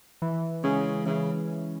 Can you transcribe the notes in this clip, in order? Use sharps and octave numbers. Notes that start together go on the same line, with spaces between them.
E3
C#3 G#3 C#4
C#3 E3